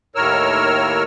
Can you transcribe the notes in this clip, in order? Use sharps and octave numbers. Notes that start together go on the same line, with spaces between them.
D#2 A2 A#4 C#5 E6 F6